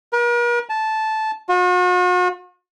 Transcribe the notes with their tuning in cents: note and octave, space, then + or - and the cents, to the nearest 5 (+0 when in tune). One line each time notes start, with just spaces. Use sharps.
A#4 +45
A5 -10
F#4 -45